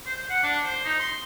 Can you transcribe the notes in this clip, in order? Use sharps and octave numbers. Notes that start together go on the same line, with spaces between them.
C5
F#5
D4
C5
D#4
C6